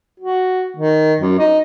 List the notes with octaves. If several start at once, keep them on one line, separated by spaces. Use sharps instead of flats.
F#4
D#3
F#2
D#4